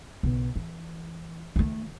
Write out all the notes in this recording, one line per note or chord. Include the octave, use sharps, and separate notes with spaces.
B1 B2
E3
D#3 A3